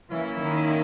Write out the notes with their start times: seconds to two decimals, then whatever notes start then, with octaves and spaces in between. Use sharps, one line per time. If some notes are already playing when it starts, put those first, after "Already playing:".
0.10 E3 A#3 C#4 E4
0.40 D#3